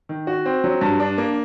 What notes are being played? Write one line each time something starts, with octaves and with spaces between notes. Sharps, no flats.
D#3
F#4
C4
F#3
G2
D4
A#3